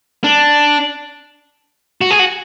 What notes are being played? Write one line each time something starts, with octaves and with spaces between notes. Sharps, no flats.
D4
F#4
G#4
F#4